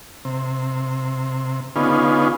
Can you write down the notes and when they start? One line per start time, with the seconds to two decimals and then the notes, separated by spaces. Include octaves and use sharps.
0.25 C3
1.76 D3 B3 C#4 D#4 F4 G#4